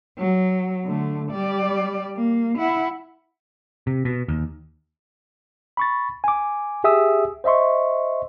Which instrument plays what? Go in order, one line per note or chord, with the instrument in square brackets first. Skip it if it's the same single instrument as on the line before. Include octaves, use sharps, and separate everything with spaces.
[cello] F#3
D3 A3
G3 D5
A#3
E4 F#5
[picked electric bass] C3
B2
D#2
[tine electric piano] B5 C#6 A6
G#5 D6
G4 G#4 E5 G#5 D#6 E6
C5 D#5 E5 C6 C#6